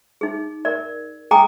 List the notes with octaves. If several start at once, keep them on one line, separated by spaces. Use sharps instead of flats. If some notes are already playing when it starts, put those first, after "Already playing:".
D#4 G#4
A#4 D5
G#4 G5 G#5 A#5 D6 D#6